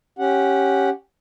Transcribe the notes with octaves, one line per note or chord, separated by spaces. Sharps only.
C#4 G4 F#5